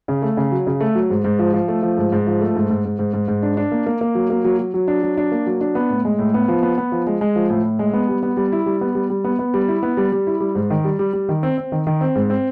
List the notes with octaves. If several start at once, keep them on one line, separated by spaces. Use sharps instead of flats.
C#3
A3
C#3
F#3
C#3
A3
F#3
G#2
G#2
F3
F3
A3
F3
G#2
G#2
F3
A3
G#2
G#2
G#2
G#2
G#2
G#2
D4
D4
A#3
A#3
A#3
F#3
A#3
F#3
F#3
F#3
D4
F#3
D4
A#3
F#3
D4
B3
A2
G#3
A2
B3
F3
B3
B3
F3
G#3
G#3
F3
A2
A2
G#3
B3
G3
B3
G3
E4
G3
B3
G3
G3
B3
B3
G3
E4
B3
G3
G3
E4
G3
G#2
D#3
G3
G3
G3
D#3
C4
C4
D#3
D#3
C4
G#2
C4